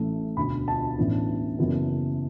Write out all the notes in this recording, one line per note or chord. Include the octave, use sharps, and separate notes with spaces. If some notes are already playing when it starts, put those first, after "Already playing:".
Already playing: A1 A2 E3 A3
E1 D2 D3 B5
A5
A1 A2 E3 B3 D4
F#1 F#2 E3 B3